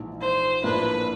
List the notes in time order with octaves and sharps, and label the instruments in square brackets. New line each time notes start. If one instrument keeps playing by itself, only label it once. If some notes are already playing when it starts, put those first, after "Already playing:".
Already playing: [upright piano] A#1 G#2 E3
[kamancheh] C5
[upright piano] A#1 A2 F3 A#3 D4 [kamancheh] B4